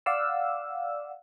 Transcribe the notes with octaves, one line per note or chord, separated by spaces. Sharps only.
D5 F5 F#5 E6